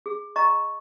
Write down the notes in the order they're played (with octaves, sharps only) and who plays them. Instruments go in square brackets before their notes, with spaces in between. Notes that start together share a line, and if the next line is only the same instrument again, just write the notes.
[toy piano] G#4
D#5 A#5 C#6